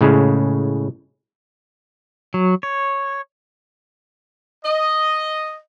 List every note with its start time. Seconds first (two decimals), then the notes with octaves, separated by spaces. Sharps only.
0.01 A2 C#3 G#3
2.34 F#3
2.63 C#5
4.65 D#5